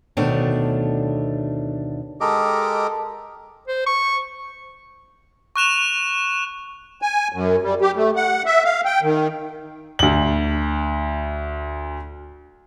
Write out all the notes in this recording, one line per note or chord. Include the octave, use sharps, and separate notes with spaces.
D2 B2 D#3 A3 D4 C#5
G#3 G4 A4 A#4 D#5 D6
C5
C#6
C#6 F#6 E7 F7
G#5
F#2
G3
G4
A3
F#5
E5
F5
G5
D#3
D2 F#7